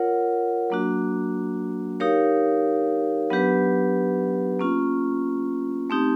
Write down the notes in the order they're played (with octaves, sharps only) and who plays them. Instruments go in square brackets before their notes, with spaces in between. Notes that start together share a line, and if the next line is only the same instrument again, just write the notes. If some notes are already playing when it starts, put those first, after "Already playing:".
Already playing: [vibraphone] F4 A#4 C#5 F#5
F#3 A#3 D4 F#4
D#4 G4 A#4 C#5 F5
F#3 B3 D4 G4 B4
A#3 C#4 F4
A3 C4 D#4 G4